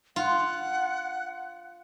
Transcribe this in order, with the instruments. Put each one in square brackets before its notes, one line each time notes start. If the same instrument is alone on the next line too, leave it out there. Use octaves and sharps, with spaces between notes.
[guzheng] F4 [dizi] F#5